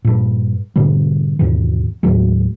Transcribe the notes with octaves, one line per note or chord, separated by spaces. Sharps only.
G2 A#2
G#2 B2 D3 G3
D#2 G#2 B2 E3
D#2 A2 F#3 G#3